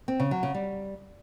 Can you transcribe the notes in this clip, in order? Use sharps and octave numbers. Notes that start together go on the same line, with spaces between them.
C4
C#3
F#3
C#3
G3